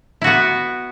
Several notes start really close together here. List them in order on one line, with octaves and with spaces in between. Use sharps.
E4 F#4 B3